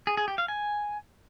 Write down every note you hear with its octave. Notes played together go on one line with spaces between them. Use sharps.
G#4
G#4
G4
F5
G#5